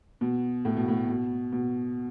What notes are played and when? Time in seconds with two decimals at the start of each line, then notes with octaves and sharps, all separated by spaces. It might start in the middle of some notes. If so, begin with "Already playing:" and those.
0.21 B2
0.65 A2
0.77 B2
0.88 A2
1.09 B2
1.52 B2